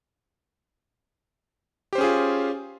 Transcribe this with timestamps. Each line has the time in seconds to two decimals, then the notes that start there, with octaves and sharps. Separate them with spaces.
1.93 G4
1.95 C5
1.98 C#4
2.01 G#4
2.04 F4